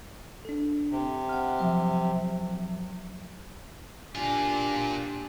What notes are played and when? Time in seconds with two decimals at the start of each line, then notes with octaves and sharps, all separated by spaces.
0.45 D4 A4
0.91 C3
1.29 F#5 F6
1.59 F3 F#3 E5
4.15 A#2 D4 F4 G4 G#5